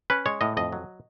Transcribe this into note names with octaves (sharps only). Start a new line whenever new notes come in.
C#4 B4
G#3 C#5
A2 D#5
F2 D#5
F#3